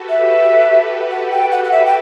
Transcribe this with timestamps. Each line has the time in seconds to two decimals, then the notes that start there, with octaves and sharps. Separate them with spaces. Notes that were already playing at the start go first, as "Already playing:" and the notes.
Already playing: F#4 G4 A4 B4
0.09 E5
1.11 F#5
1.31 G5
1.52 F#5
1.64 F#5
1.72 E5
1.86 G5